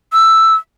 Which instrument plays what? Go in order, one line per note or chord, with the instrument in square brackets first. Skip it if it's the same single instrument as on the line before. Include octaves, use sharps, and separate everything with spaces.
[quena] E6